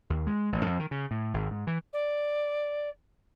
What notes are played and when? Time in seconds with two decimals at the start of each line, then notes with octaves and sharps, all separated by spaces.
0.10 D#2
0.27 G#3
0.52 A1
0.66 F2
0.79 D#3
0.91 C#3
1.11 A2
1.34 G#1
1.51 G#2
1.67 E3
1.93 D5